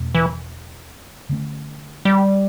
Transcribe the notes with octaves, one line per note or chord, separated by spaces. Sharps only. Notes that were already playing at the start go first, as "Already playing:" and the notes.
Already playing: E2 B2 A3 C#4
E3
D3 A3 C#4
G3